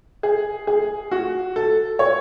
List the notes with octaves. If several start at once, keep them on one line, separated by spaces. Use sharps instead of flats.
G#4
G#4
F#4
A4
C#5